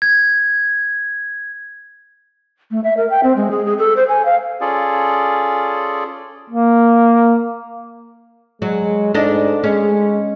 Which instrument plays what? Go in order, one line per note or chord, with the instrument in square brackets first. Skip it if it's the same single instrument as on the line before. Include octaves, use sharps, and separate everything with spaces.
[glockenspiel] G#6
[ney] A3
E5
A#4
G5
C4
G#3
G#4
G#4
A4
C5
G#5
F5
[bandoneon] C#4 F4 G#4 A4 D5
[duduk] A#3
[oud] F#3 [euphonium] G#3
[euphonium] G#2 [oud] D4 A4 D#5
[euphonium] G#3 [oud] C#4